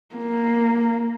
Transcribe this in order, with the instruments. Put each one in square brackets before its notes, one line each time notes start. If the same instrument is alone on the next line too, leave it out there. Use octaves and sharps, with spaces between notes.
[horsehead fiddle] A#3